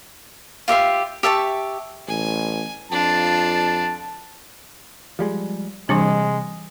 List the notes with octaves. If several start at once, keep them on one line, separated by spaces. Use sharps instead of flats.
F4 G4 E5 C6
G4 E5 A5 C#6
A1 G#5
F2 D4 F4 A5
F3 G3 G#3
C3 E3 G3 G#3 D4